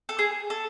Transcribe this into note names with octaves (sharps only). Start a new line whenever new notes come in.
A4
G#4
A4